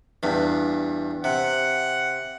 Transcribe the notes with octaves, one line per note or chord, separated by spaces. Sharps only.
E2 G2
C3 F#5